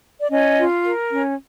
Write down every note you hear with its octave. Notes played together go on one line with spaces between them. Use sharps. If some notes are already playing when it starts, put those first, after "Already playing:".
D5
C#4 D#5
F4
A#4
C#4